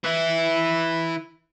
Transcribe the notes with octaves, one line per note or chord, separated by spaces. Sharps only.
E3 E4